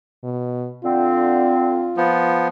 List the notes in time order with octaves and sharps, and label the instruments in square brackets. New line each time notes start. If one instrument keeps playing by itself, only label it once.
[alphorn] B2
[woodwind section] D3 C4 [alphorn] F4
[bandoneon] F3 B3